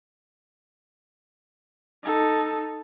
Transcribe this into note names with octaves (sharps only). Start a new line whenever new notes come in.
D#4 A4